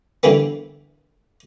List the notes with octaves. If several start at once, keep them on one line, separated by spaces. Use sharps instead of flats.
D3 E3 G3 A#3 B3